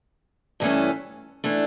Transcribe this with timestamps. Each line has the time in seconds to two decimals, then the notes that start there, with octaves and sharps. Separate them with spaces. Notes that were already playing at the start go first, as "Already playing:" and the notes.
0.60 G2 E3 A3 C#4
1.44 E3 A3 D4